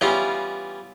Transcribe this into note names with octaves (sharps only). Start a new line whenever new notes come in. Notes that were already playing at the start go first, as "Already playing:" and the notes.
E3 G3 B3 C#4 E4 F4